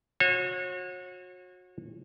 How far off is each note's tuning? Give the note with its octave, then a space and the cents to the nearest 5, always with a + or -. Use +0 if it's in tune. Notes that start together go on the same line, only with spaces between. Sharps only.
F#4 -30 C#5 -35